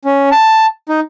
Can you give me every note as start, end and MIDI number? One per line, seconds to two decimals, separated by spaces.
0.05 0.29 61
0.31 0.66 81
0.89 1.00 63